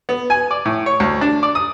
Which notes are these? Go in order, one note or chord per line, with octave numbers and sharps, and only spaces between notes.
B3
G#5
D5
A2
C#5
D2
D4
D5
D#6